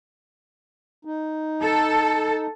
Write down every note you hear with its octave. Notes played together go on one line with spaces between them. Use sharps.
D#4
A4